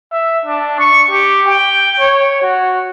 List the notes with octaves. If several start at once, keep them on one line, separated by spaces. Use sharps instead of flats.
E5
D4
C#6
G4
G5
C#5
F#4